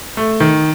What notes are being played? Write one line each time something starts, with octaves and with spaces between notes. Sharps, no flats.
A3
D#3